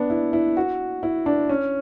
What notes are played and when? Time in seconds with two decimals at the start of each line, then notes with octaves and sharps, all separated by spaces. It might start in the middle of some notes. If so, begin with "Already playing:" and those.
Already playing: B3 D4
0.10 E4
0.33 E4
0.57 F#4
1.03 E4
1.26 D4
1.49 C#4